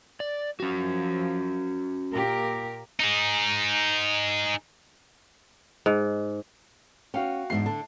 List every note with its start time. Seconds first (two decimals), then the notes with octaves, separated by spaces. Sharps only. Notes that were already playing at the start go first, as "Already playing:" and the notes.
0.20 D5
0.60 F3 F#3 C#4 F#4
2.14 A#2 G4 A#4
3.00 D#4 G#4
5.86 G#2
7.14 C#4 F#4 F5 G5
7.50 E2 G#2 D4 C7
7.66 D3 A5